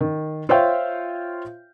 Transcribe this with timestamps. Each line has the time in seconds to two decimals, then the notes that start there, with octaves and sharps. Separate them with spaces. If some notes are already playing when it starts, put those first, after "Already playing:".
0.01 D#3
0.49 F4 C5 C#5 E5 F5 G5